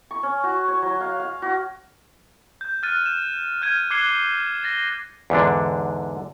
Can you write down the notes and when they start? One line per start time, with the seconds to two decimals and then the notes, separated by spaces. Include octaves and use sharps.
0.11 C#6
0.23 C#4
0.43 F#4
0.68 C#5
0.82 F#3
1.01 F5
1.20 F5
1.42 F#4
2.61 G6
2.83 F6 F#6 A6 D#7
3.06 E7
3.62 F6 G6 G#6 D#7
3.90 D6 F#6 G#6 C7 C#7 G7
4.64 A6 A#6 G7
5.30 E2 G#2 D3 D4